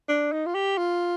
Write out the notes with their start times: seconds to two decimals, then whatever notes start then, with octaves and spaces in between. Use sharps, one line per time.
0.09 D4
0.32 D#4
0.46 F4
0.55 G4
0.77 F4